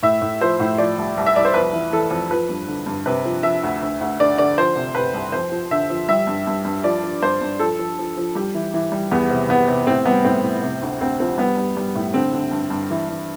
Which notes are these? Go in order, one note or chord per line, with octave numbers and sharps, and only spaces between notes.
A2 E5
A2
F3 C5
A2
F3 D5
C2
C2
E5
C2 D5
C5
F2 B4
E3
E3 A4
F2
F3 B4
G2
D3
G2
C3 B4
F3
F3 E5
D2
D2
D2
D3 D5
D3 D5
F3 C5
C3
C3 B4
C2
F2 C5
F3
D3 E5
F3
G3 E5
G2
G2
G2
F3 D5
F3
G2 C5
G2
F3 A4
F3
F3
F3
G3 G4
E3
E3
G3
E2 B3
C3
E2 B3
C3
A2 C4
G3 B3
A2 C4
A2
C3
D2
D2 C4
F3 C4
G3 B3
G3
G3
A2
D3 C4
D3
G2
G2
E3
E3